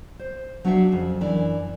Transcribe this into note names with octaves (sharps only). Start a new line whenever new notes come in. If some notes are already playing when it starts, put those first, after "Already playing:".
C5
F#3 D4 F#4 C5 E5 F5
F2 C#3
F#2 E3 D4